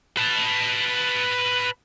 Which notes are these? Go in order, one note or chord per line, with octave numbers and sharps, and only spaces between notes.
B4 A5